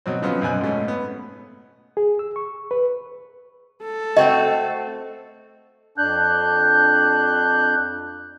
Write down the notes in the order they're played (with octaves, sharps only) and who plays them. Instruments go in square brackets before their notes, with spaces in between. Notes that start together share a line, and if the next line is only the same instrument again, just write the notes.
[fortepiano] B2 F#3 C4
C#3 F3 F#3 B3 C#4 F4
F#2 B2 G#5 F#6
G#2 B2 A3 C#4
B3
[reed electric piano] G#4
E6
C#6
B4
[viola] A4
[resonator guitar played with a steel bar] A3 C4 F#4 [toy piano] D#5
[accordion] F2 D4 F#6 G6